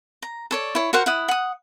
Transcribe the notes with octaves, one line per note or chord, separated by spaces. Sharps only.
A#5
A4 C#5 D5
E4 C#5
F#4 A#4 C5 F#5
E4 F#5 D#6
F#5 D#6